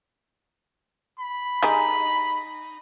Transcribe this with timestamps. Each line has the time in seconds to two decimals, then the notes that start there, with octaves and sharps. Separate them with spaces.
1.19 B5
1.63 G#3 D#4 G4 G#5